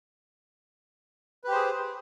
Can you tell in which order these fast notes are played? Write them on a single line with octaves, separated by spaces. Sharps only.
B4 G4 C5 G#4